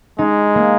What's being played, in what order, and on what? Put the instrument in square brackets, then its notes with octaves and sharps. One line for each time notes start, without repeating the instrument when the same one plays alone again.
[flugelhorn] G#3 [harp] D#4
[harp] A#3